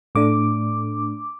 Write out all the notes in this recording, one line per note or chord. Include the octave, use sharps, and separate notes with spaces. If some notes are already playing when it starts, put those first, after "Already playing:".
A2 A3 D4 D6